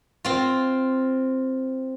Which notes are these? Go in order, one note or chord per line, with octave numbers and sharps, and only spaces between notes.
C4 F4